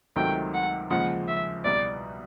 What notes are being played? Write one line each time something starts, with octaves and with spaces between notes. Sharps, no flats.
C#2 C3 D#3 F#3 A3 G5
F#5
D#2 C#3 F3 G#3 F#5
E5
C2 B2 G3 D5